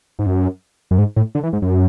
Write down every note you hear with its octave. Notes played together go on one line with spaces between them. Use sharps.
G#2
F#2
F#2
G#2
A2
D3
E3
G#2
F#2